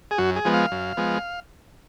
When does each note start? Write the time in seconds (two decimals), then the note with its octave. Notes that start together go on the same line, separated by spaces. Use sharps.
0.11 G#4
0.18 F#2 F#4
0.36 G#4
0.45 F3 G#3 B3
0.54 F5
0.72 F#2
0.97 F3 G#3 B3